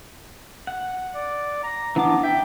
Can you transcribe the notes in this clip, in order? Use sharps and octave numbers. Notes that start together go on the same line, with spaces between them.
F#5
D5
A#5
E3 B3 D4 D6
E5 G5